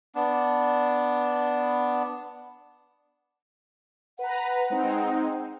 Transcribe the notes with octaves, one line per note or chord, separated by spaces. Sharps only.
B3 D4
B4 F#5 A#5
G#3 C4 D#4